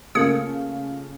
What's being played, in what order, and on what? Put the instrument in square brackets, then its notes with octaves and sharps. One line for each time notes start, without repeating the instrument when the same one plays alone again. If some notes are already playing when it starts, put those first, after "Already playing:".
[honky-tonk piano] C#3 A3 F4 [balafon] A#3 A#4 [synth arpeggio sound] D#6 G#6 C#7